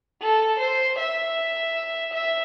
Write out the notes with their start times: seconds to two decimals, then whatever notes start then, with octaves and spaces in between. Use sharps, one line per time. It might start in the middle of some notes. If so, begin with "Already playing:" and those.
0.21 A4
0.60 C5
0.99 E5
2.14 E5